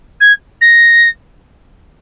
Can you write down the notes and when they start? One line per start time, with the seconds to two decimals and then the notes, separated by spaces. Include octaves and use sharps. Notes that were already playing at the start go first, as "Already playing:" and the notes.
0.21 G#6
0.61 A#6